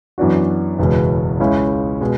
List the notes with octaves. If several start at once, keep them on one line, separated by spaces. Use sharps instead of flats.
F#2 E3 B3 D4 F#4
F#1 E2 B2 G#3
C#2 C#3 G#3 C#4 E4
B2 G#3